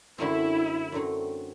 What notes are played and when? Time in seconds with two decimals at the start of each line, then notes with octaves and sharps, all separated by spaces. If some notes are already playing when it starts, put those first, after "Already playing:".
0.18 F#2 D3 F#3 A3 C4 E4
0.92 F#2 D3 F#3 A3 C4